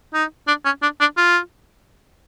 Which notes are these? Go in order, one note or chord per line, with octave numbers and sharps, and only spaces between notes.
D#4
D4
C#4
D4
D4
F4